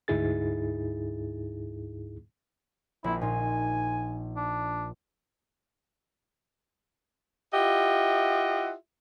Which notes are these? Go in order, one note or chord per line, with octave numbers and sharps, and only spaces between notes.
D2 G#2 D#4 E4 G#4 A6
A#1 C4 E4
A#2 D#4 F4 G#5
D4
E4 F4 G4 D#5 E5 F#5